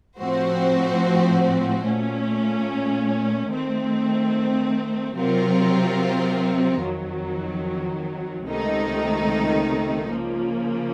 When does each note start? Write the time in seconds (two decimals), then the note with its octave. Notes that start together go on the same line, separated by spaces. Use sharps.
0.19 A2 F3 C4 F#4 C5
1.83 A#2 A3 C#4
3.49 D#3 A3 C4
5.15 C3 F#3 C4 F4 A#4
6.80 F2 D#3 F#3
8.46 C#2 C3 D#3 A3 D#4
10.11 C#3 F3 A#3